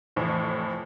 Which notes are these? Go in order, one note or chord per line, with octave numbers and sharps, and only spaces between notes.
F1 F2 A2 E3